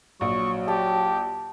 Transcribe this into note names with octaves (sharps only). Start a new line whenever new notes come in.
A#1 F#3 C#6
G4 A5